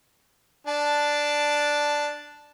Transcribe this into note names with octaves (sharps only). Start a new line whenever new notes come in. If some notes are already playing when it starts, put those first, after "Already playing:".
D4 A5